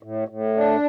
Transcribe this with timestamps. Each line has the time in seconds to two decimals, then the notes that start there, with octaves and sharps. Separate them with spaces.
0.03 A2
0.28 A2
0.56 D4